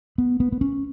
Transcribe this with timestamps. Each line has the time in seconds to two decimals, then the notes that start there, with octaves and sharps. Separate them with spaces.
0.18 B3
0.40 B3
0.52 B3
0.61 C#4